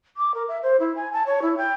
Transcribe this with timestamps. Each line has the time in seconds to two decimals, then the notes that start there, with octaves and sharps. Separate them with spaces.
0.17 D6
0.34 A#4
0.48 E5
0.63 C5
0.80 E4
0.96 G#5
1.13 A5
1.26 C#5
1.42 E4
1.58 G5